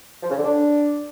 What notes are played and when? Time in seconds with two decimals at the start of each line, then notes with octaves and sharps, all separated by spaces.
0.23 F3
0.30 C#3
0.37 D3
0.44 D4